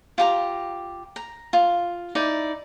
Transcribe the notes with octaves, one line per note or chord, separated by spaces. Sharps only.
F4 G4 A#5
A#5
F4
D#4 E4 D5